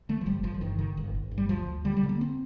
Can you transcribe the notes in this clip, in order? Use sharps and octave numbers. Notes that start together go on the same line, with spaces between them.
D3 A3
F3
G1 G3
G1 F3
F3
G2 D#3
D3 D#3
G1
G1
G2
G3
D2 F3
D2
D3 G3
G3
D3
A#3
C4